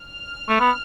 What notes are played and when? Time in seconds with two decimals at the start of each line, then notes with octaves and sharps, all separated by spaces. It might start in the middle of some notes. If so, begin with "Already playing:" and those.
Already playing: F6
0.49 A3
0.60 B3